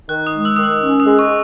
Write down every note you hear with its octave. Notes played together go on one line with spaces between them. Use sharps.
D#3 F#6
D#6
G#3
E6
D#3 D#6
E6
C#4
D#6
G#3
C#6